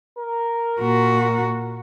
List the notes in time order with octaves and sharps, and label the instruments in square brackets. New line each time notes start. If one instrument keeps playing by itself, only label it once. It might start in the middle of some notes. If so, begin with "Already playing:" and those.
[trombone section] A#4
[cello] A#2 F#4